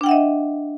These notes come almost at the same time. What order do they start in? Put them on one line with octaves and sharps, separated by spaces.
D4 G5 F#5 E5 D#5